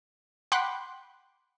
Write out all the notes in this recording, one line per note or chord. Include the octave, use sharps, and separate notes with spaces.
F#5 G5 B5 C6 D6 F#6